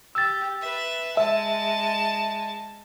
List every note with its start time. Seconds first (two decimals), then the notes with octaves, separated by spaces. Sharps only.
0.15 G4 E6 A6
0.61 B4 E5
1.17 G#3 E5 A5